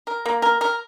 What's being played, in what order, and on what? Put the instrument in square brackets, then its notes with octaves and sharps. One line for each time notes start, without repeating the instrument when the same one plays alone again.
[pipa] A#4
A#3
A#4
A#4